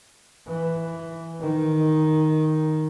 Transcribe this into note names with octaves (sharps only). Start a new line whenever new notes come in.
E3
D#3